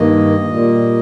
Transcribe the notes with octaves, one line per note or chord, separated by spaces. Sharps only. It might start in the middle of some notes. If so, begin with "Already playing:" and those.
Already playing: G2 D#3 A#3 D#5
A#2 G3 A#3